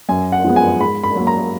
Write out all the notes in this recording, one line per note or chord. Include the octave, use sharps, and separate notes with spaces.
F#2 G#5
F#5
F3 G#3 B3
G#5
G#2 B5
B5
F#3 A#3
A#5